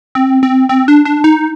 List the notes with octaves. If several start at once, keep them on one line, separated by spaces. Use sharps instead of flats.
C4
C4
C4
D4
D4
D#4